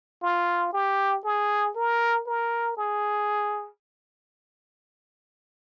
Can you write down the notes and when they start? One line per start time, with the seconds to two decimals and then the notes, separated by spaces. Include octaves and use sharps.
0.22 F4
0.73 G4
1.24 G#4
1.76 A#4
2.27 A#4
2.77 G#4